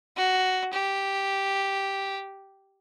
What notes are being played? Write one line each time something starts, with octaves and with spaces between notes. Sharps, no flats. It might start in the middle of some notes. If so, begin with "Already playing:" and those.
F#4
G4